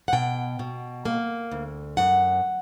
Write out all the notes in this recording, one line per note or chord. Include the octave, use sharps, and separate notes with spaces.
F#5
B2 G5
B2
A#3
D2
F#2 F#5